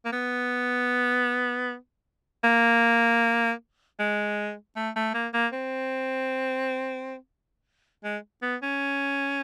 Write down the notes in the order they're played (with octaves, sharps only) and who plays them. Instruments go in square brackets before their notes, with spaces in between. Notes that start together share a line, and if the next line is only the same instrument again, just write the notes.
[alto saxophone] A#3
B3
A#3
G#3
A3
A3
A#3
A#3
C4
G#3
B3
C#4